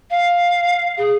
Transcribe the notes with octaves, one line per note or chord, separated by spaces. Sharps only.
F5
G#4